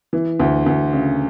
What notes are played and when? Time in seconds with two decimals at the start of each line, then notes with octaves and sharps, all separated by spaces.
0.13 E3
0.40 D2
0.66 D2
0.93 C#3